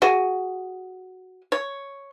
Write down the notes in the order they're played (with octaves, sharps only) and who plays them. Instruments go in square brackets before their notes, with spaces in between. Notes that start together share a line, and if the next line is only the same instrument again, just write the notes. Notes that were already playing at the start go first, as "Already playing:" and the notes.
[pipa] F#4 G#4
C#5